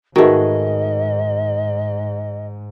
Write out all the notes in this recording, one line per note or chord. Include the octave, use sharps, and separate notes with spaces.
G#2 D#3 A3 F#4 G#4 B4 D#5